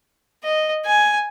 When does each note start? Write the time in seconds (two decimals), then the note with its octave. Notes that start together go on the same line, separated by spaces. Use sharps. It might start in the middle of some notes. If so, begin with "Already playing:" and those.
0.43 D#5
0.86 G#5